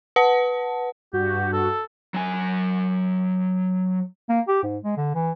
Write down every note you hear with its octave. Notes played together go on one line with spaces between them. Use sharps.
B4 F#5 A5
G2 F#4 G4
A4
F#3 G#5
A#3
G4
G#2
G#3
D3
E3